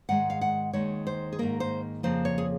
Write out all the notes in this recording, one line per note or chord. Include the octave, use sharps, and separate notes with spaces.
G#2 D#3 G#3 F#5
F5
F#5
D#2 D#3 G#3 C#5
C5
G#4
G#2 D#3 A#3 A#4
C5
F2 C#3 F3 A#3 C5
C#5
G#4